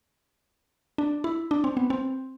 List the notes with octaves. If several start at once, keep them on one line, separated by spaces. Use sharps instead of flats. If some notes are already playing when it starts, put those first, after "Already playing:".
D4
E4
D4
C4
B3
C4